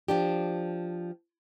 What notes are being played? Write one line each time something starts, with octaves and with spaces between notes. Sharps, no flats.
F3 D4 G4